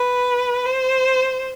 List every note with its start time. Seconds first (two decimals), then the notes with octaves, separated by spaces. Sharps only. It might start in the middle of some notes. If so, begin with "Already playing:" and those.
Already playing: B4
0.66 C5